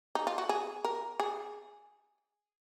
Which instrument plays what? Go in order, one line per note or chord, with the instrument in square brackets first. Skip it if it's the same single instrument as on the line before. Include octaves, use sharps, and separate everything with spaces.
[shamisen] D#4
F4
F#4
G#4
A#4
G#4